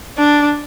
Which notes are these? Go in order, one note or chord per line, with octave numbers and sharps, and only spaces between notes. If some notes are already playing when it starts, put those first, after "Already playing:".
D4